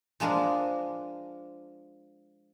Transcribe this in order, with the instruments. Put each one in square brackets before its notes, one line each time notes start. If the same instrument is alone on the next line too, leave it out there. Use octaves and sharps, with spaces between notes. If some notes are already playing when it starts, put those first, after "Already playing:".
[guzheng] F3 G#3 D4 A#4 C6